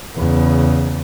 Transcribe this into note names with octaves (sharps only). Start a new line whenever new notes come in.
E2 C#3